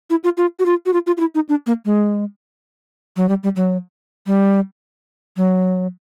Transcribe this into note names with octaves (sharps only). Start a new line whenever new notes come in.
E4
F4
F4
F#4
F4
F#4
F4
F4
F4
E4
D#4
D4
A#3
G#3
F#3
G3
G3
F#3
G3
F#3